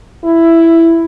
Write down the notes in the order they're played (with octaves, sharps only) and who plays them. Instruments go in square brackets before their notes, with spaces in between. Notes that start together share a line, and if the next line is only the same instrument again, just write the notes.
[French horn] E4